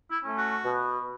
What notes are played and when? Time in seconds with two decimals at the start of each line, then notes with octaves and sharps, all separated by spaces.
0.09 E4
0.23 A3 C#4
0.37 F#4
0.65 B2